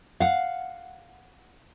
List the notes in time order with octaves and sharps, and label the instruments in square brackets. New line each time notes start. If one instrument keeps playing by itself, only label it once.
[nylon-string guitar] F5 F#5